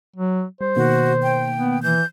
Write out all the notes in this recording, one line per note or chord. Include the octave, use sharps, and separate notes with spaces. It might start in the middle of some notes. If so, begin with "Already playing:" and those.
F#3
G3 C5
B2 D#3 A#3 F#4
G5
B3
E3 G6